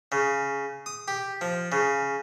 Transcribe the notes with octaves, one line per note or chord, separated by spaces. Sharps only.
C#3
D#6
G4
F3
C#3